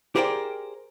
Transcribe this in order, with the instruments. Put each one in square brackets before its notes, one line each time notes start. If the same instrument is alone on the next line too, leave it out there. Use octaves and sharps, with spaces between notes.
[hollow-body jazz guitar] G4 G#4 A#4 C5 D5 G5